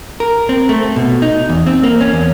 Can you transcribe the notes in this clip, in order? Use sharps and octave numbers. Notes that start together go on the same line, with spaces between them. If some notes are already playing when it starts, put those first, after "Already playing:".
A#4
C4
A3
B2
D#4
E2
C4
A#3
C#4
E2